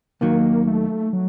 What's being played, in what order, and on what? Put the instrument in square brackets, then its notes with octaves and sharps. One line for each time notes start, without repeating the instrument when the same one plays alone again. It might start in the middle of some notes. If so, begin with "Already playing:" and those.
[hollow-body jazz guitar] D#2 D#3 F#3 [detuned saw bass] A#3
[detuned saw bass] A3
F#3